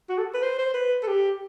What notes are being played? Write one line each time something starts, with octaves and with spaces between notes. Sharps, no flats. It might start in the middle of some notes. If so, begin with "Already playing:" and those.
F#4
A4
B4
C5
C5
B4
A4
G4